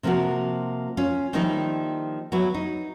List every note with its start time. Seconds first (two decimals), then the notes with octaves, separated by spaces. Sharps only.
0.03 C3 F3 A#3 F4 F#4 A#4
0.97 C#4 F4
1.33 D#3 F3 G3 A#3 D#4 E4
2.32 F#3 B3 E4
2.54 D#4